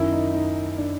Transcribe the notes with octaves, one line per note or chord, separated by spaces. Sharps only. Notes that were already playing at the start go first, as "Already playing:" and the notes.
Already playing: F#2 D#3 E4
D#4
D#4
D4